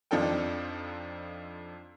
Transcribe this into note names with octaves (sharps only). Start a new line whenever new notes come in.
F2 F3 D4 D#4 A4 G5